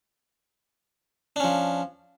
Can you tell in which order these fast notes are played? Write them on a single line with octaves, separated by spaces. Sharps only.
D4 C#4 F3